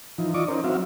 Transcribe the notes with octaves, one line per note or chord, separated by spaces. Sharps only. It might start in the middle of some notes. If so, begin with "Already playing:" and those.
E3 F3 D#4
F4 D5 D#5 C#6 D6
C#4 D#4 A#4 C5
F#3 C4 F#4 E5 F5